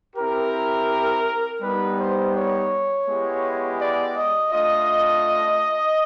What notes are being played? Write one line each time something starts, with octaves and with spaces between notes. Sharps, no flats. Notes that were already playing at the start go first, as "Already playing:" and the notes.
C4 E4 G4 A#4
G3 B3 D#4 G4 B4
C5
C#5
G#3 B3 E4 G4
D5
D#5
A3 D4 F4 D#5